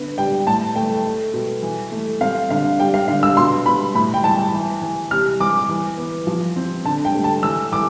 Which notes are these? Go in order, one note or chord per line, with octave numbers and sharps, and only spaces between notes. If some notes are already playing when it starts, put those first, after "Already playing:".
Already playing: D3 B3
G3 G5
A2 A5
A3 G5
A3
B2
E3
A3
C4 F5
D3 F5
G3 G5
F5
D3 F5
E6
B2 C6
B2 B5
A2 B5
G5
E3 A5
E3
E3
C3 F6
E3 D6
E3
B3
F3
C4
D3 A5
G5
A3
A5
E3 E6
E3 D6